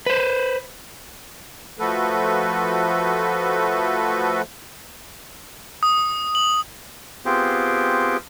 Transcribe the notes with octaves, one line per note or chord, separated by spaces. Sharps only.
B4 C5
F3 A3 F#4 A4 B4
D#6
F#7
B3 C4 F4 G4 G#4 C5